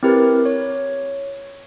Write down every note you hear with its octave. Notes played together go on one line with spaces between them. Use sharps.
C4 E4 G4 A#4 B4
C#5